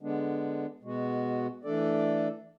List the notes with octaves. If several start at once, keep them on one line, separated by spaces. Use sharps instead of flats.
D3 G#3 B3 D4
B2 G#3 B3 F#4
E3 A3 D4 A4 D5